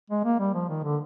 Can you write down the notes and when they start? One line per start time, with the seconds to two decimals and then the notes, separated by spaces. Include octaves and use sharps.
0.10 G#3
0.25 A#3
0.39 G3
0.54 F3
0.69 D#3
0.83 D3